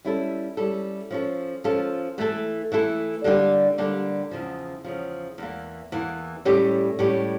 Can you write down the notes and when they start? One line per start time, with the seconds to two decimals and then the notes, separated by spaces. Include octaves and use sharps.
0.05 G3 C#4 E4 A4
0.57 G3 C#4 E4 A4
1.11 F3 C#4 F4 A4
1.64 F3 C#4 F4 A4
2.18 E3 A3 E4 A4
2.72 E3 A3 E4 A4
3.24 D3 G3 A#3 D4 G4
3.78 D3 G3 A#3 D4 G4
4.31 E2 C#3 F3
4.84 E2 C#3 F3
5.38 E2 E3 A#3
5.92 E2 E3 A#3
6.45 A2 G3 C#4 G4
6.99 A2 G3 C#4 G4